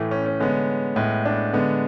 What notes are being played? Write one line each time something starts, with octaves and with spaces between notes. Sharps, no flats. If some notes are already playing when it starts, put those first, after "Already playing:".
Already playing: A2 E3 A3
C#4
C#4
D3 G#3 B3 C#4
A2 G#3 B3
D4
D3 G#3 B3